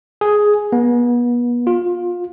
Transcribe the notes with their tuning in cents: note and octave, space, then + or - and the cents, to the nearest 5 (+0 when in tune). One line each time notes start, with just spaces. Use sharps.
G#4 +5
B3 -35
F4 +20